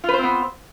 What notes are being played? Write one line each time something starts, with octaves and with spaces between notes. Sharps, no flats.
B3 C4 F4 B4 C5